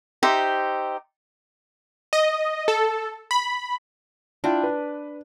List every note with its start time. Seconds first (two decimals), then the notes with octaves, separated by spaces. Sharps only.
0.23 D#4 G4 C5 E5
2.13 D#5
2.68 A4
3.31 B5
4.44 D4 E4 F4 G5
4.64 B4